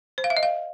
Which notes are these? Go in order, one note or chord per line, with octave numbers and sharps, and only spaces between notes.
C5
F5
E5
D#5
F5